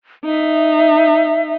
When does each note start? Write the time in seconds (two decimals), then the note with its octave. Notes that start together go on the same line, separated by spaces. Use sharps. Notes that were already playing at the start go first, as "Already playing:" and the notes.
0.25 D#4 E5